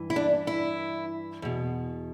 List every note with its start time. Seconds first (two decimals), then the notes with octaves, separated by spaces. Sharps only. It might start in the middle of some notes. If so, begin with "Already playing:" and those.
Already playing: G2 E3
0.10 E4
0.16 D4
0.47 E4
1.42 E2 B2